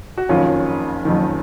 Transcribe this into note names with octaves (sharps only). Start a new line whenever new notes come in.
F#4
F#1 F2 D#3 C#4 F4
F#1 F2 D#3